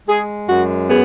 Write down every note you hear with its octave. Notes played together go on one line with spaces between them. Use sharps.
G#3 G#4
F#2 F#4
B3 G#4